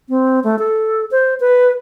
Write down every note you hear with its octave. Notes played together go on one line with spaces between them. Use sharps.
C4
A3
A4
C5
B4